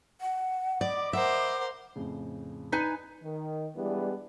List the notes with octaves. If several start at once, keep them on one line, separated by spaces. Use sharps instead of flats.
F#5
D5 D#5 B5 D6
A#4 C5 E5 F#5
F2 A2 C#3
D#4 B4 G#5 B6
D#3
E3 G3 G#3 B3 D4